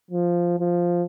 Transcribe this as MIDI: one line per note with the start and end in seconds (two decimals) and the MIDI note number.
0.11 0.56 53
0.59 1.03 53